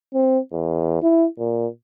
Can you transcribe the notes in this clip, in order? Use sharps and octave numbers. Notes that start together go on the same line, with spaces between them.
C4
E2
E4
A#2